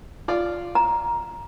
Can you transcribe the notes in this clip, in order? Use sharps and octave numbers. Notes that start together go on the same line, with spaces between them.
F4 D5
A#5